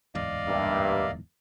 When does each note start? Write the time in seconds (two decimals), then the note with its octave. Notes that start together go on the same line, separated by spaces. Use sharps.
0.15 D1 E2 G#2 D5 D#5 F5
0.48 G2 A#3 E5